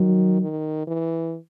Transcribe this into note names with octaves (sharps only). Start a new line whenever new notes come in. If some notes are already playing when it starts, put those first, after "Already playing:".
Already playing: D#3 F#3
D#3
E3